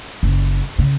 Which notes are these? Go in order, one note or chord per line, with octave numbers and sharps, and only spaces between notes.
F#1
C#3